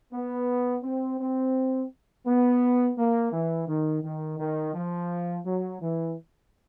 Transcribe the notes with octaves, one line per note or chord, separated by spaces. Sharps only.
B3
C4
C4
B3
A#3
E3
D#3
D#3
D#3
F3
F#3
E3